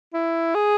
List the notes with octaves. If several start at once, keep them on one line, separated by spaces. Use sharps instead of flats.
E4
G#4